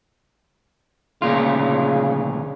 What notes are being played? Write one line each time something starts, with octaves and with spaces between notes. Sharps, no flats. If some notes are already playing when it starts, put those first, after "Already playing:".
D2 A#2 C#3 F4